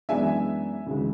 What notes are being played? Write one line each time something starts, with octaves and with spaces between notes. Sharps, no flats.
F#2 E3 G#3 B3 D4 E5 G#5
D2 C#3 E3 G#3